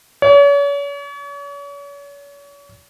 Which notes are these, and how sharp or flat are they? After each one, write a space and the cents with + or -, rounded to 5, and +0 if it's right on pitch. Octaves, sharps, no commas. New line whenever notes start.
C#5 +40